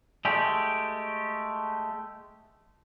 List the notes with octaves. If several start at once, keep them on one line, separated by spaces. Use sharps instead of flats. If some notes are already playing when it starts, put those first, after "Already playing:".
G#3 A3 G4